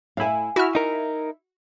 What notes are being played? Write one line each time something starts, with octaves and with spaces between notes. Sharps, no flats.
A2 E4 F5 G#5
E4 F#4 E5 F6
D#4 A#4